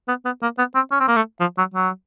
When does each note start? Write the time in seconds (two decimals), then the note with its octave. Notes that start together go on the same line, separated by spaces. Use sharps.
0.08 B3
0.25 B3
0.42 A#3
0.58 B3
0.75 C4
0.91 C#4
1.00 C4
1.08 A#3
1.16 A3
1.40 F3
1.58 F#3
1.74 F#3